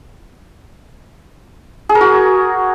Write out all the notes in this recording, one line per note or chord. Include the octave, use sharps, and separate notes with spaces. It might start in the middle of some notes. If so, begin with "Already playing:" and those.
G#4
A#4
F#4